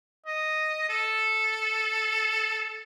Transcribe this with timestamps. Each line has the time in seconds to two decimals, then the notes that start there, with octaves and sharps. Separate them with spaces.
0.26 D#5
0.89 A4